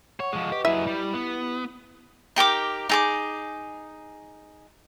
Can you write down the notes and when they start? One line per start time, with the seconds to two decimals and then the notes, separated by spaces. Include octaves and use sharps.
0.20 C#5 F#5 C#6
0.33 F3 G#3
0.52 G4 B4 D#5
0.65 F#3 E4 G4 G#4 E5 B5
0.87 G3
1.14 B3
2.36 D#4 G4 A#4 D6
2.89 D#4 G#4 D6